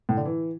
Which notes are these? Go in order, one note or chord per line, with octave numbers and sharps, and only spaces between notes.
A2
D3
E3